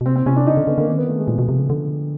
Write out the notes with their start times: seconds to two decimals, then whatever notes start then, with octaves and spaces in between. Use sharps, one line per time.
0.01 B2
0.06 C3 C4
0.16 C4
0.26 C3 C#4
0.36 D4
0.47 C#3 D#4
0.57 D3
0.67 D3 B3
0.77 D3 A#3
0.88 D#3 C4
0.98 B3
1.08 A3
1.19 G#3
1.28 A#2 F3
1.39 B2
1.48 C3
1.59 C#3
1.70 D3